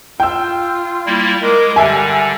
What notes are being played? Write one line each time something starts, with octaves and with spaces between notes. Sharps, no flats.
F4 G5 E6
G3 A#3 E4
G#3 A#4 D6
D3 G3 E5 G#5